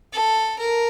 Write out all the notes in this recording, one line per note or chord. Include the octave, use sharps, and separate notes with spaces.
A4
A#4